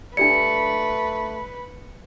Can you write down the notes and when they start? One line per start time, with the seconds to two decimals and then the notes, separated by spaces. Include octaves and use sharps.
0.17 A3 D4 G4 B4 D5 C#7